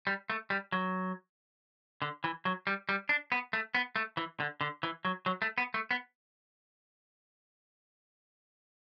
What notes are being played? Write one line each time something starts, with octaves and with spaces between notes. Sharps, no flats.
G3
A3
G3
F#3
D3
E3
F#3
G3
G3
D4
B3
A3
B3
A3
E3
D3
D3
E3
F#3
F#3
A3
B3
A3
B3